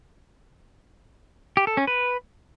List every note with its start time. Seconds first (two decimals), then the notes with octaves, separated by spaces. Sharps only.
1.57 G4
1.67 A4
1.77 C#4
1.87 B4